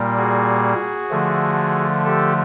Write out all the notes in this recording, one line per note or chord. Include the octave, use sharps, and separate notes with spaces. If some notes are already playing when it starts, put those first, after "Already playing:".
Already playing: A#2 G3 A#3
F#4 G#4
D3 F3 A3
G4 A4